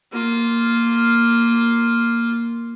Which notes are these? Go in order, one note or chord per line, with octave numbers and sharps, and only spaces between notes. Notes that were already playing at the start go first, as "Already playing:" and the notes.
A#3 F4